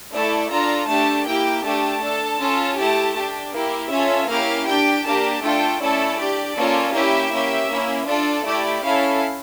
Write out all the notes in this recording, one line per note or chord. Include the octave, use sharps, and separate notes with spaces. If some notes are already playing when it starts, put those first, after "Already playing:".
A3 E4 A4 D5
D4 F4 A4 A#5
A3 D4 G4 A5
A#3 E4 G4 G5
A3 D4 G4 A5
D4 A4
C#4 F4 A4
A3 E4 G4 A5
D4 G4
A#3 E4 G4
C#4 F4 A4 E5
A#3 C#4 E4 G4 F5
D4 G4 G5
A#3 D4 G4 A5
A3 D4 F4 A4 G5
A3 C#4 E4 A4 D5
D4 G4
A#3 C#4 F4 A4
A#3 C#4 E4 G4 E5
A#3 C#4 G4
A#3 C#4 E4
D4 F4 A4 D5
A3 E4 G4 D5
C#4 E4 A4 F5